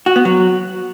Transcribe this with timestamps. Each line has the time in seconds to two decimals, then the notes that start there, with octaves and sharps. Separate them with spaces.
0.06 F#4
0.16 B3
0.25 F#3